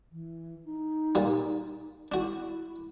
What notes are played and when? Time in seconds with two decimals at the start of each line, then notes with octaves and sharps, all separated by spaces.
0.12 E3
0.65 D#4
1.15 A#2 G3
2.12 D4 E4 F#4